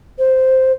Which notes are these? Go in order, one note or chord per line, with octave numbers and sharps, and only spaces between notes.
C5